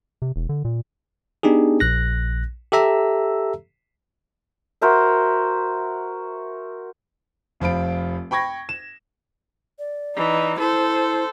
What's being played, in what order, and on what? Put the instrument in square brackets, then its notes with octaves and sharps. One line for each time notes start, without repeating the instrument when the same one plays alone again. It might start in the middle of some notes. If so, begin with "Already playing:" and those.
[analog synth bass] C3
E1
D3
A#2
[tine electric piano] B3 D4 D#4 G4 G#4
A#1 F#6 A#6
G4 A4 E5 A#5 E6
[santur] F#4 A#4 C5 E5
[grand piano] F1 F3 F4 B5 D7
G5 B5 C#6 G#6 A#6
E7
[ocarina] D5
[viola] E3 [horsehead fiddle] D#4
[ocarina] E4 [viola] A4 [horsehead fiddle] C5